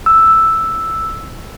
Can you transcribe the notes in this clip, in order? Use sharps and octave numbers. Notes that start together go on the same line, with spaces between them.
E6